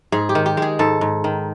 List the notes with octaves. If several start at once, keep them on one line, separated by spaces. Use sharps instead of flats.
G#2 G#4
G4
D#3
G4
G#3 G#4
G#2 A4
G#2
D#3